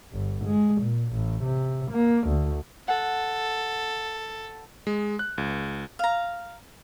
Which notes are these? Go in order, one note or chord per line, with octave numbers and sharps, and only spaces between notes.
G1
G#3
A#2
A1
C3
A#3
D2
A4 F#5
G#3
F#6
C#2
F5 A#5